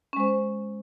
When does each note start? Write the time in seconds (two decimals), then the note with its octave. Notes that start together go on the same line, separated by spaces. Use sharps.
0.13 C#4
0.16 G#3
0.20 C5